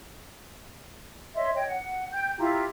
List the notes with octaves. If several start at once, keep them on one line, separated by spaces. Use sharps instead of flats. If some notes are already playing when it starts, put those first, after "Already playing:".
C#5 D#5 E5 C6
C#5 D#5 G5
F#5
G5 G6
E4 F4 G4 A#5